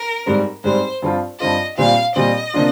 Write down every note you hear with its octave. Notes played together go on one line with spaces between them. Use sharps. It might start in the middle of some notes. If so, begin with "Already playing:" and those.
Already playing: A#4
G#2 G3 C4
G#2 G3 C4 C5
G2 F3 C4 F4
G2 F3 C4 F4 D#5
A#2 G3 C4 F4 F5
A#2 G3 C4 F4 D#5
C3 F3 A#3 D4 F4